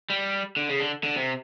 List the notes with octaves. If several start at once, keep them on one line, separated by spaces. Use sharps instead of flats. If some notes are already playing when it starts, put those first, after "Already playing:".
G3
D3
C#3
D3
D3
C3